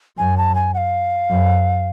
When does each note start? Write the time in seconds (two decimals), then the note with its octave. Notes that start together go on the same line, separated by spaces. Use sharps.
0.18 F#2 G#5
0.38 A5
0.55 G#5
0.74 F#5
0.77 F5
1.30 F#2